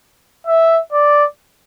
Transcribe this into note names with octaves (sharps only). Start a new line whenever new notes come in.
E5
D5